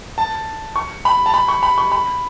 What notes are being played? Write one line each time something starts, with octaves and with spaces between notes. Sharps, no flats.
A5
C#6
B5
A5
B5
C#6
B5
C#6
B5